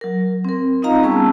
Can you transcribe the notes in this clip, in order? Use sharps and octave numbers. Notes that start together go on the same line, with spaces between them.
F#3 A#4
C4 A#4
C4 D#4 F4 D#5 F5 A#5
G3 B3 C#4 G#4 A5 E6